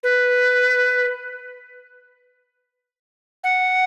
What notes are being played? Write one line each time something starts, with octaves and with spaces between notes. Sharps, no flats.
B4
F#5